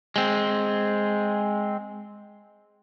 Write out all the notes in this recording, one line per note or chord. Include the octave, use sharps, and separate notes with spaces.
G#3 C4